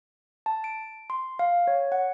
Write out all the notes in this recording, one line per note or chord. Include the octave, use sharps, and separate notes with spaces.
A5
D7
C6
F5
C#5
F#5